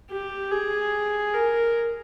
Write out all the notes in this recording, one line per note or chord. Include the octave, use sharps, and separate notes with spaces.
G4
G#4
A#4